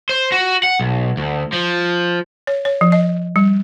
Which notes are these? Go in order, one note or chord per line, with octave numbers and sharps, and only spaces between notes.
C5
F#4
F#5
B1
D2
F3
C#5
C#5
F3
D#5
G3